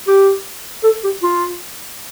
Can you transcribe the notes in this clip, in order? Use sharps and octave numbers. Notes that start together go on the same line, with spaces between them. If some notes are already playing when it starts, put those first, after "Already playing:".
G4
A4
G4
F4